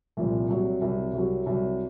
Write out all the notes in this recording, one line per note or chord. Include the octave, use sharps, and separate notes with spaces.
C2 A#2 F3 C4
C2 C3 F#3
C2 C3 F#3
C2 C3 F#3
C2 C3 F#3